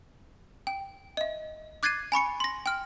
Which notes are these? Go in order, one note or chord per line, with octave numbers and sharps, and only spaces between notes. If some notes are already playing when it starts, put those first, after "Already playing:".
G5
D#5 E5
D6 F#6 G#6 A6 C7 D#7
G#5 B5 C#6 C#7
C6 A#6
G5 F6